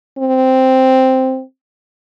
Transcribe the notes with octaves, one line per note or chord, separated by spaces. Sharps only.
C4